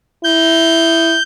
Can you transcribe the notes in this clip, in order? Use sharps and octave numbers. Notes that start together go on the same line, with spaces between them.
E4 G6